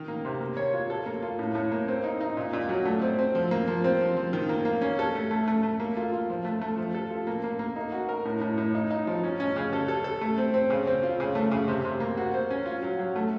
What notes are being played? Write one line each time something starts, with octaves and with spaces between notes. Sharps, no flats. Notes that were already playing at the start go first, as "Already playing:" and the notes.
Already playing: D#3
A#3
C3
A#3
C#5
F4
A4
A#3
F4
A2
A2
A#3
C4
D#4
D#4
A#2
A#2
F#3
A3
C4
C4
F3
A#3
F3
C4
F3
F3
D#3
A#3
A#3
C#4
A4
A3
A3
A3
A3
A#3
F4
F4
F3
A3
A3
F3
A4
F4
A#3
A#3
A#3
D#4
F#4
A#4
A2
A2
A2
D#4
D#4
F3
C#4
C#4
C#3
A4
A4
A4
A3
C4
C4
C#3
C4
F4
C#3
A3
C#3
C3
C3
A#3
F#4
C5
C#4
F4
F#3
F#3
A3